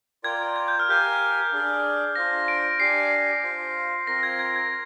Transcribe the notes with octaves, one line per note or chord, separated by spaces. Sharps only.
F4 A#4 D5 G5 G#6
G#6
G6
F6
G4 A#4 F5 G#5 G6
D4 G#4 D5
D4 F4 C5 F5 A#6
D7
D4 G4 D5 G#5 C7
F4 C5 F5
C4 F4 A#4 A#6
G#6
G#6
G#6